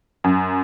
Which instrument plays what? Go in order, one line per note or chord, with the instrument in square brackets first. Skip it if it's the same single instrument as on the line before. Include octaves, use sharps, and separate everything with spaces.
[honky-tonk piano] F#2